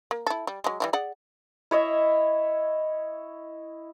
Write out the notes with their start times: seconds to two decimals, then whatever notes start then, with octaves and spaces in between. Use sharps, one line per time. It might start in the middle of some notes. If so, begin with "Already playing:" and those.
0.11 A#3
0.27 E4 A4
0.47 G3
0.64 F#3 G#3
0.80 E3 G3 E4
0.93 G#4 D5 F#5
1.71 E4 C#5 D#5 E5